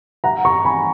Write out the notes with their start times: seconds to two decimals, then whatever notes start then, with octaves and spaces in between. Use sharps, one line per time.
0.24 F#5 A#5
0.45 A#5 C#6
0.65 G#5 B5